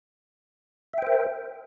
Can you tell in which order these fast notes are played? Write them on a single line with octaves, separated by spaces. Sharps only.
E5 G5 C5 A#4